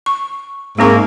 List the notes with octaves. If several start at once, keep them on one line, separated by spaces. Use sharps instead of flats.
C#6
G#2 G#3 A#3 C4 C#6